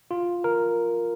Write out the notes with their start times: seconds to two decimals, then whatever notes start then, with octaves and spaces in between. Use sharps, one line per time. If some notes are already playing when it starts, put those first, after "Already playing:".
0.11 F4
0.44 A#4